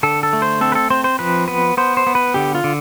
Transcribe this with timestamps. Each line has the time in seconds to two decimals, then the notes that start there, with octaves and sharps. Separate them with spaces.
0.03 D3 A4
0.23 A4
0.33 A3
0.42 C5
0.61 C4 A4
0.72 B4
0.75 A4
0.90 C4 C5
1.04 C5
1.19 F3 B4
1.48 B3 B4
1.77 B3 C5
1.97 C5
2.07 B3
2.15 B4
2.34 D3 G4
2.55 F4
2.64 D3